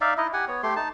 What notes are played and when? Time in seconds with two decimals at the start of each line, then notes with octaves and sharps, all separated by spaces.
0.01 D#4 D5 E5 F5
0.18 D#4 E4 D#5
0.33 G4 F#5 G#5
0.48 B3 C#5
0.63 A3 G4 C6
0.76 D#4 A5